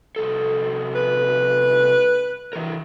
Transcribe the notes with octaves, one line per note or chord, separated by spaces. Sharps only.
C2 A4
B4
E3 A#4